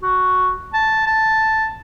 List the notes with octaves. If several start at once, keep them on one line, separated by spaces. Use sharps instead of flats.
F#4
A5
A5